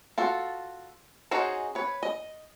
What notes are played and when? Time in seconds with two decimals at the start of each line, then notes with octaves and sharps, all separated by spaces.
0.18 F4 F#4 A4
1.31 C#4 D#4 F#4 G#4 C5
1.75 B4 C#5
2.03 D#5